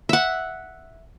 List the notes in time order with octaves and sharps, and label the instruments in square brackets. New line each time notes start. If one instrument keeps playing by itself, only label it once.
[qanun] E5 F#5